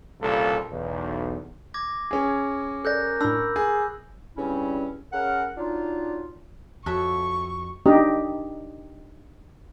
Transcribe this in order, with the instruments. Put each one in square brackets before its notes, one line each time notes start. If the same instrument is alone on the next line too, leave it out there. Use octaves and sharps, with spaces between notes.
[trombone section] C2 A#2 C#3 F4 A4
B1 E2
[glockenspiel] D6 G#6 A#6
[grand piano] C#4 G#4
[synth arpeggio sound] A4 D5 [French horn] A#4 [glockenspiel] F#6 G6 A#6
[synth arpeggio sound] A2 D4 [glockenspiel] B5 E6
[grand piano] G#4
[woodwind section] G2 C#3 G3 C4 C#4 E4
C#3 A#4 F#5
F#3 D4 D#4 F4
[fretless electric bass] F2 [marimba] F#4 [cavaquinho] A4 C#5 E5 [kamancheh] C#6
[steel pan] D4 D#4 G4 D#5